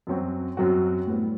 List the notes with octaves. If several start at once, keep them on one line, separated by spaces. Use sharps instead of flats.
F#2 F#3 C4 F#4
F#2 F#3 C4 F#4
A2 G3 B3 F#4